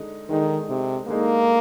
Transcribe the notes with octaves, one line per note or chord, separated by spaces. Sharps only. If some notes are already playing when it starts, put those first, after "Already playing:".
Already playing: D3 G#3 D#4
D3 D#3 G#3 D#4
C3
D3 G#3 A#3 D#4